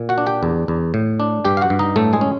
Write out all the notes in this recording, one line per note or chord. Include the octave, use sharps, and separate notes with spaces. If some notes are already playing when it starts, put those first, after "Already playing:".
Already playing: A#2
F#4 F#5
D4
G4 G5
E2
E2
A2
D4
G2 G4 G5
F5
F#4 F#5
G2
D#4 D#5
A2 A3 A4
G#3 G#4
C#4